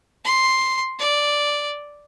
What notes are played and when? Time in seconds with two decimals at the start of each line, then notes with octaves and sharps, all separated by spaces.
0.24 C6
0.99 D5